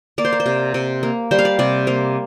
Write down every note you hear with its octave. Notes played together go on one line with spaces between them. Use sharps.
A#3 D5
C5
A#4
C5
C3
C3
A#3
G3 C5
F5
D5
C3 D5
A#3 C5